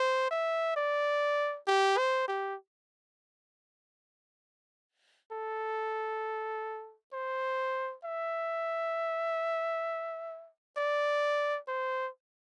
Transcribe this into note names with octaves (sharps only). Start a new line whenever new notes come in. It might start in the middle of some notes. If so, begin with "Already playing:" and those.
Already playing: C5
E5
D5
G4
C5
G4
A4
C5
E5
D5
C5